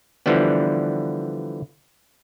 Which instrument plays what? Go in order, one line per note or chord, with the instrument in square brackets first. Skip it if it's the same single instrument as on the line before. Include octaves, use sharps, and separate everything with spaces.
[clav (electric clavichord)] D3 E3 F3 G3 B3